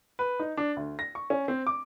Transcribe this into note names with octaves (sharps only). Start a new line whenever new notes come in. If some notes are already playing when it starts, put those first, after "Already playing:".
B4
D#4
D4
D2
A#6
C#6
C#4
C4
D6